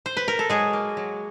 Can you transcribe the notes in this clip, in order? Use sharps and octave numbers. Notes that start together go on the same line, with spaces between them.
C5
B4
A#4
A4
F#3 G#3 G#4
A#3
F#3